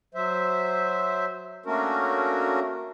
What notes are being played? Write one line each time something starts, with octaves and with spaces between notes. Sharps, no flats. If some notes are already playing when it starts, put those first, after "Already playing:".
F#3 C5 E5
A3 A#3 C#4 D4 F#4 A#4